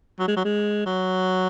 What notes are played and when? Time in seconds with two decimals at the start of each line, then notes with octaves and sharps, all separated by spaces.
0.19 F#3
0.28 G#3
0.36 F#3
0.44 G#3
0.85 F#3